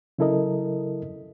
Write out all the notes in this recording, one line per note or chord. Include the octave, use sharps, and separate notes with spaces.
C#3 F#3 E4 A4 A#4 D#5